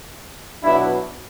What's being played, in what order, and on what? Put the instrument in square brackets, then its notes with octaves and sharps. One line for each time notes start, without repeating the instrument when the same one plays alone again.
[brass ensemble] B2 F#3 B3 D4 E4